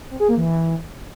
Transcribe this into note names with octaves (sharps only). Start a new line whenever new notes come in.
C4
G#4
A#3
E3